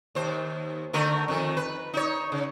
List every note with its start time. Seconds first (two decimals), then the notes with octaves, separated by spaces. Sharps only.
0.15 D#2 C5
0.93 D3 A3 A#4
1.28 F2 D#3
1.57 B4
1.94 D#4 C#5
2.32 C#3